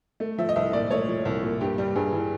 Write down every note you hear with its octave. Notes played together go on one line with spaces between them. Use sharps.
A3
F3 E5
D#5
C2 E5
A#2 D5
A3 C#5
F3
C2
A#2
G2 G4
G3
G2 G#4
E3